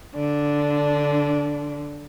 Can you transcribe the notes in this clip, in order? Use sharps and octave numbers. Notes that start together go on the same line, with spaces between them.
D3 D4